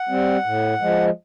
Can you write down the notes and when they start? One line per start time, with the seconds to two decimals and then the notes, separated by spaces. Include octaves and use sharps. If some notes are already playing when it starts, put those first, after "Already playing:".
Already playing: F#5
0.09 G3 C4
0.45 A2
0.81 F3 G#3